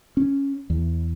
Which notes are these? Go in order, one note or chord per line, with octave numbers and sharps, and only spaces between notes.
C#4
E2